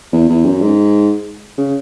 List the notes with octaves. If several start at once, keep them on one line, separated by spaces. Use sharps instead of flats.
E2
E2
F#2
G#2
C#3